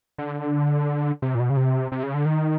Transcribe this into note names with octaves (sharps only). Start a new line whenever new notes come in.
D3
C3
A#2
B2
C#3
C3
C3
C#3
D3
D#3